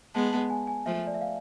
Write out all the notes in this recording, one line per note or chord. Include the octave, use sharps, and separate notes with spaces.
G#3 B3 A5
A5
G#5
G#5
F3 A3 E5
D5
E5
F5